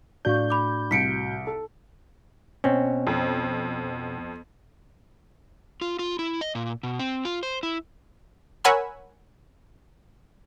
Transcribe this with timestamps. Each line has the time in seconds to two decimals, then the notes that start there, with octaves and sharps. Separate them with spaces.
0.25 A2 D4 F#4 D5 F5 C#6 G6
0.50 B5 D6
0.91 C2 B6 C#7 D7
1.47 A4
2.64 B2 C4 C#4
3.07 F2
5.81 F4
5.99 F4
6.19 E4
6.41 D#5
6.55 A#2
6.83 B2
6.99 C4
7.25 F4
7.43 C5
7.63 E4
8.64 A#4 C#5 F#5 G#5 B5 E6